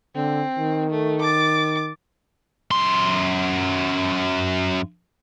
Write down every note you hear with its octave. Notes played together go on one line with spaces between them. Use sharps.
D3 C4
D#3
A3
D6 A6
F#2 C6